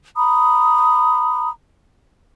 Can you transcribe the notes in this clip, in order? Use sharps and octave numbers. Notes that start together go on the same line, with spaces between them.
A#5 B5 D#6